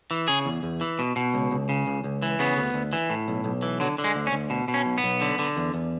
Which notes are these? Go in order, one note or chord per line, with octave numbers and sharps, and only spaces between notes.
E3
C#3 G#4
E2
E2
E3
B2
B2
C#2
C#2
C#3
C#2
C#2
E3
C#3 B3
D2
D2
E3
A2
B1
B1
E3
D3 F#3
D3
G#3
D2
C#4
D2
B2
B2
C#4
B1
B3
B1
D3
D3
E2
E2